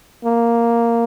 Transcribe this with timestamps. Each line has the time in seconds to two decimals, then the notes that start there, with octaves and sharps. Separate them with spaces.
0.25 A#3